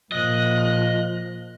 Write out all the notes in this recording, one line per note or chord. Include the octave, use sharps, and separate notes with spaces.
A#2 F3 D#5 F#6